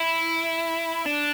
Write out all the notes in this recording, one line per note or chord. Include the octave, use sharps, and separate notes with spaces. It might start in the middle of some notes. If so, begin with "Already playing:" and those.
Already playing: E4
D4